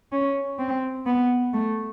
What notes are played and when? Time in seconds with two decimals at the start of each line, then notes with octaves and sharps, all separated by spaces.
0.12 C#4
0.59 C4
1.06 B3
1.53 A3